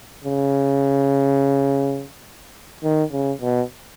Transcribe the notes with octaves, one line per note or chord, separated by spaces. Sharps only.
C#3
D#3
C#3
B2